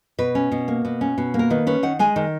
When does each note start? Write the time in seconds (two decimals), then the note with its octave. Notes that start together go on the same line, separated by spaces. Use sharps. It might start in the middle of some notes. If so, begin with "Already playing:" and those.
0.18 B2 B4
0.35 C#4
0.52 B2
0.68 A#3
0.85 B2
1.01 C#4
1.18 B2
1.34 A#3
1.39 A#4
1.50 D#3 B4
1.67 C#4 B4
1.83 D#3 F#5
1.99 G#3 G#5
2.16 D#3